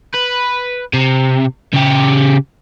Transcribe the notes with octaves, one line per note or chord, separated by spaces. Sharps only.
B4
C3
C#3 G4